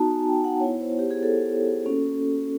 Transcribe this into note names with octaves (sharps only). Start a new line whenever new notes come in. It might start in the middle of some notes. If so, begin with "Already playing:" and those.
Already playing: B3 D#4 F#4 A5 A#5
G#5
G5
F#5
B3 E4 C#5
C5
G4
G#4
A4
A#3 C#4 F#4